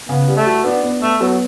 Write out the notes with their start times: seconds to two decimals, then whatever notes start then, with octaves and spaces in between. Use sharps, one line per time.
0.09 C#3 B3
0.28 G3
0.36 A3
0.46 F#4
0.64 B3 D4
0.83 B3
1.02 A3 A4
1.21 F#3 B3